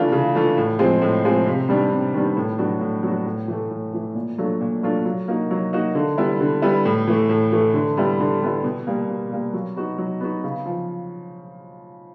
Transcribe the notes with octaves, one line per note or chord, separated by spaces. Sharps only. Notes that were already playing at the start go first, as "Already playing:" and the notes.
Already playing: C#3 E3 A3 D4 F4
C#3
E3 A3 D4 F4
A2
F3 G#3 C4
A2
F3 G#3 C4
C3
D#3 G3 B3 D4
C3
D#3 G3 B3 D4
A2
F#3 B3 D4 F#4
A2
F#3 B3 D4 F#4
A2
E3 A3
A2
E3 A3
A#2
F#3 A3 D4 F4
A#2
F#3 A3 D4 F4
F#3
A#3 D#4 F#4
F#3
A#3 D#4 F#4
D3
G3 B3 E4
D3
G3 B3 E4
A2
E3 A3
A2
E3 A3
D3
G3 B3 E4
D3
G3 B3 E4
B2
G3 A#3
B2
G3 A#3
F#3
B3 D#4 F#4
F#3
B3 D#4 F#4
C#3
F3